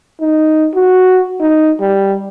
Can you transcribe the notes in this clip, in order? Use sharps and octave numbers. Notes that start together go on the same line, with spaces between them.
D#4
F#4
D#4
G3